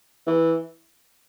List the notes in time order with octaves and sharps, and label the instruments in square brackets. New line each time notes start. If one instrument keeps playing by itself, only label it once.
[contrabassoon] E3